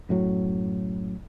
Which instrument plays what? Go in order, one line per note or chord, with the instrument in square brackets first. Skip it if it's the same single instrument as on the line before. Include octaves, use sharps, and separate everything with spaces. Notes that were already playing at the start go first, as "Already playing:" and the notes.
[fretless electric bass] F#2 A2 F#3